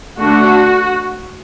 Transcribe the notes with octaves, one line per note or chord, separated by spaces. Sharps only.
D3 A3 D4 F#4